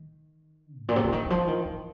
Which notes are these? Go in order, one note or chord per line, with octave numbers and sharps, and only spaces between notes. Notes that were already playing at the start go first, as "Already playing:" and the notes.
Already playing: D#3
G#2
A#2
C3
D3
D#3
D#3
F3
D#3
D#3